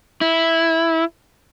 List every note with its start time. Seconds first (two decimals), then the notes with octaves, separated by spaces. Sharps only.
0.21 E4